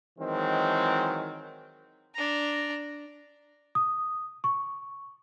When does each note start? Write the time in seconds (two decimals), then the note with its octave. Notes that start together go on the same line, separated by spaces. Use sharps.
0.19 D#3 E3 F#3 G#3 C4
2.15 D4 A#5
3.75 D#6
4.44 C#6